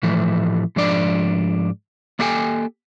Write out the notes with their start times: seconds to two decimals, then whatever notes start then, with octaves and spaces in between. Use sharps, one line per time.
0.03 A2 E3 F3 A3
0.76 G#2 F3 D4 D5
2.19 A#3 D4 G4 A4 G5 G#5